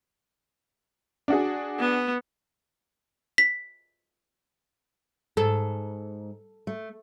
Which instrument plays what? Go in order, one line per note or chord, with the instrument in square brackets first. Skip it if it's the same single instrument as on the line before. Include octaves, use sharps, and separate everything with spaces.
[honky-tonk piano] D4 F#4 G#4
[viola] B3
[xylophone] B6
[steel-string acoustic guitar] G#2 [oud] A4
[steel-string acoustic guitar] A3